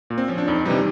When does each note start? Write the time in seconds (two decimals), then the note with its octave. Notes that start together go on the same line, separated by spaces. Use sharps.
0.10 A#2
0.18 C4
0.28 F3 C#4
0.38 D4
0.48 F2 D#4
0.65 C3 E3 G3 D#4